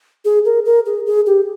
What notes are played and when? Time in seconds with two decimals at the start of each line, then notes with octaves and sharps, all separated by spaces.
0.25 G#4
0.45 A#4
0.65 A#4
0.86 G#4
1.06 G#4
1.26 G4